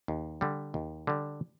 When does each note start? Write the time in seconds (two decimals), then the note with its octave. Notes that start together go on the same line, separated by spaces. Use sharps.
0.08 D#2
0.41 D3 G3
0.74 D#2
1.07 D3 G3